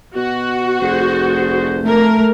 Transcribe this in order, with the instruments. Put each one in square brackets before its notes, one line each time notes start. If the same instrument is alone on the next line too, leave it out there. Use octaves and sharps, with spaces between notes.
[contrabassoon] B2 [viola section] F#4
[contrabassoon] F1 [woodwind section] D2 G#4 C5
[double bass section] A3 [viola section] A#4